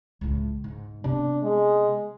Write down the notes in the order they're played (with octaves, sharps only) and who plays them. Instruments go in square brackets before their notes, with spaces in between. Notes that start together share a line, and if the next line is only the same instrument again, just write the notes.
[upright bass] C#2 A2
G#2
[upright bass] C3 B3 [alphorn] D4
[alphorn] G#3